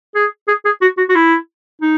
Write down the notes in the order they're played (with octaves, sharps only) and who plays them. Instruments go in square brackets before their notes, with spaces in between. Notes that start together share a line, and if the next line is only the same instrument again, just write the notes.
[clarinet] G#4
G#4
G#4
F#4
F#4
F#4
E4
D#4